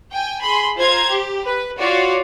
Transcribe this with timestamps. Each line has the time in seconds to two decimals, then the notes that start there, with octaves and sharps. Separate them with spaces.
0.10 G5 G#5
0.42 G#4 B5 C6
0.77 F4 C5 A#5 G#6
1.10 G4
1.44 B4
1.77 F4 F#4 C#5 D5